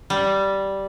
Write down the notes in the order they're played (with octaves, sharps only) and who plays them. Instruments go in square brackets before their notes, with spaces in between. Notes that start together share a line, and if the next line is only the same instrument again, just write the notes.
[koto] G3